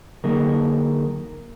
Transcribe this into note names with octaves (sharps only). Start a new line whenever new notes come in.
D3 F#3 A#3 D#4 G#4 A#4